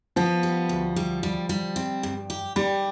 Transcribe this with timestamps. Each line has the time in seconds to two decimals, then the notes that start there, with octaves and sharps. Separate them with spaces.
0.16 F3 B3
0.43 G3
0.69 D2
0.96 G3
1.23 G3
1.49 G3
1.76 C4
2.03 G2
2.30 G4
2.56 G3 G4